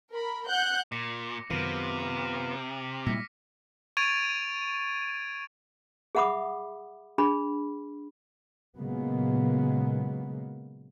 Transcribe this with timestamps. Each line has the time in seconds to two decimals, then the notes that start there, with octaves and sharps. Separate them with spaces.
0.11 A#4 B5
0.48 F#5 F#6 G6
0.92 A#2 D6 A#6 C#7
1.50 F#2 C3 D#3 B3 F4 F6 D7 D#7
2.00 D6
3.06 A#2 G3 G#3 E4 A#6 B6 C#7
3.97 C#6 G#6 A6 D7 D#7 F7
6.15 G#4 E5 F#5 B5 D6 D#6
7.18 D4 G#4 B5
8.76 A#2 C#3 F#3 G#3 A#3 B3